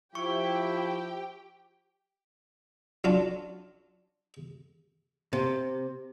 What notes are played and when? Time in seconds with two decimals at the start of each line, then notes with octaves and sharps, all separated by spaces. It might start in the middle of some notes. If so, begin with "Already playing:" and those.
0.15 F3 E4 G4 G5 C#6
3.04 F#3 C#4 D4 F4
5.33 C3